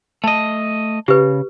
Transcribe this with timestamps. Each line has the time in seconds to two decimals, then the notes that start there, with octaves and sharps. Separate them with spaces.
0.24 A3 D#5 A5
1.08 C#3 G4 B4